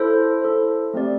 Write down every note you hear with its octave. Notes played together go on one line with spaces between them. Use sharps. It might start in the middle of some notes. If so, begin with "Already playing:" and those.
Already playing: E4 A4 C5
E4 A4 C5
A3 C4 G4 D5